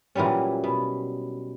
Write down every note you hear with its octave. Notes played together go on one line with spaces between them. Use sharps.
A#2 E3 F#3 G3 C#4
B2